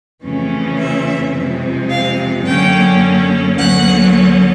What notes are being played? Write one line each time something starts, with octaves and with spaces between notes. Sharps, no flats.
F2 C#3 E3 A3 C#4
E5
F2 C3 F3 G#3
F5
F#2 D3 F#3 A#3 C#4 G5
D2 D3 F#3 A#3 C#4 F#5